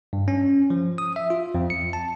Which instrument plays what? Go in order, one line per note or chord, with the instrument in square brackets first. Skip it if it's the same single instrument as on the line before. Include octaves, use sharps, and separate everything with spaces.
[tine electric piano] G2
C#4
F3
D#6
E5
F4
F2
C#7
A5